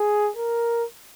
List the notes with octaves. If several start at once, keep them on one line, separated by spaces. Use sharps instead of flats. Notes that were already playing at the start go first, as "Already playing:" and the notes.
Already playing: G#4
A#4